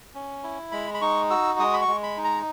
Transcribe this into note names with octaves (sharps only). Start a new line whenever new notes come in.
C#4
E4
G#3 B5
B5
D#4 C#6
F#4 E6
G#3 D#6
B5
C#6
G#3
B5
D#4
A#5